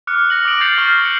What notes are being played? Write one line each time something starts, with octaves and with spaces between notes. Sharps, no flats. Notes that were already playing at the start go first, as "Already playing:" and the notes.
D6 F6 F#6 C#7
F6 A#6 C#7 F#7
D6 D#6 A#6 D7 F#7
G6 A6 C7 C#7 F7 F#7
C#6 F6 A6 C7 G7
F#6 C#7